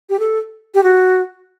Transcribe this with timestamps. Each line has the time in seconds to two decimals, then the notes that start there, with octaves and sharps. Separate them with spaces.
0.10 G4
0.19 A4
0.75 G4
0.83 F#4